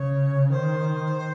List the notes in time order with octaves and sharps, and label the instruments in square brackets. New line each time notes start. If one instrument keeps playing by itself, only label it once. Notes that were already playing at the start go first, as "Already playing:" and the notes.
Already playing: [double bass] C#3 [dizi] C#5
[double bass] D#3 [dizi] C5